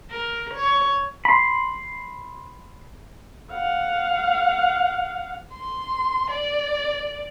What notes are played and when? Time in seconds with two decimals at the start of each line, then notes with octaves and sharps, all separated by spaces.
0.10 A#4
0.54 C#5
1.25 B5 C6
3.51 F5 F#5
5.53 C6
6.30 D5